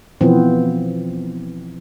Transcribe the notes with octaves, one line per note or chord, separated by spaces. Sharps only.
B2 E3 F3 B3 C4